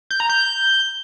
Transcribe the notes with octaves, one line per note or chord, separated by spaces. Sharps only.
G6
A#5
G6